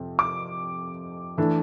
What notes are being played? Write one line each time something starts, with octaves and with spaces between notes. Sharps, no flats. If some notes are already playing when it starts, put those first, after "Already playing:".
Already playing: F2 C3
D6
E3 A3 D4